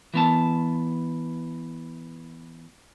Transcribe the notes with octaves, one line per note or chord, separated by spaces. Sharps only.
E3 B3 A5